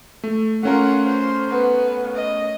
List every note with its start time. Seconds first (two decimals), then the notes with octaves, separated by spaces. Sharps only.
0.24 A3
0.63 A3 C#4 F4 A#4 F#5
1.06 C5
1.51 B3
2.15 D#5